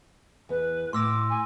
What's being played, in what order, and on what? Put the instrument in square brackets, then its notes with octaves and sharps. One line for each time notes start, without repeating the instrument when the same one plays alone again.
[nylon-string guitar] E2 [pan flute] B4
[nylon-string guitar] A2 [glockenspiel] C6 E6 A#6 [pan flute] D6
[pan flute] G#5